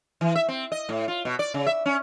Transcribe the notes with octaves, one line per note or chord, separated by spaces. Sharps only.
E3
E5
C4
D#5
A2
F4
B2
D5
C#3
E5
C#4